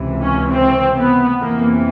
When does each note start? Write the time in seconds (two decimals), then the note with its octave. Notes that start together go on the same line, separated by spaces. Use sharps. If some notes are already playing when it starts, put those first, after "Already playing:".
Already playing: C#2 C3 E3
0.22 C#4
0.52 C4
0.97 B3
1.41 F2 C3 E3 A#3